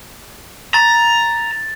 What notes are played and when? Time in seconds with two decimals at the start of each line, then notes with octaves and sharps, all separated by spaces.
0.74 A#5 A6